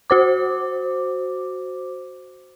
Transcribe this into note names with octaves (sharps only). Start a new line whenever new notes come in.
F#4 C5 D6